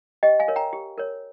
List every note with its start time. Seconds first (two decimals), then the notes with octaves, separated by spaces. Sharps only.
0.23 G4 D#5 G5
0.40 F5 G#5
0.48 A#4 C#5
0.56 G5 A#5
0.73 G4
0.98 A#4 C#5